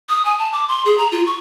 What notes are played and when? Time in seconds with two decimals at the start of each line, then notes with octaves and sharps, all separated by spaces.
0.09 D#6
0.25 G#5
0.38 A5
0.53 D6
0.68 C6
0.85 G#4
0.98 A#5
1.12 F4
1.27 C#6